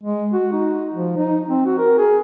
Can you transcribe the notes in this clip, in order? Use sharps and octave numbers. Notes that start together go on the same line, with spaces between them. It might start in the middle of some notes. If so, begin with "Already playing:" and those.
G#3
F#4
D#4
F3
D#4
C4
F#4
A#4
G#4